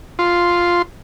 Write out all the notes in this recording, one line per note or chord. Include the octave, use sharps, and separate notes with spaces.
F4 C6